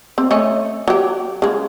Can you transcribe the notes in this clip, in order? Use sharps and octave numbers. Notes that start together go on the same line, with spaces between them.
C4
A3 C#4 D#5
F#3 G4
C#3 G#3